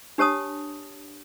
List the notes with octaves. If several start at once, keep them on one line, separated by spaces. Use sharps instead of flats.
D4 G4 C#5 A5 D#6